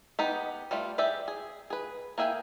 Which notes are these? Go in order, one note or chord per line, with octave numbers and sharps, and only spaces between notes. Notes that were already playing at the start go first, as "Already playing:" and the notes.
B3 D#4 G4
G3 A3 F4
G4 G#4 D5 E5
G#4
G#4 B4
A#3 G#4 E5 G5 G#5